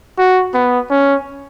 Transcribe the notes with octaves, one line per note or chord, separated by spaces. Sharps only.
F#4
B3
C#4